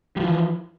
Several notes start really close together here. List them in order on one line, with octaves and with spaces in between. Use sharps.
G3 F3 E3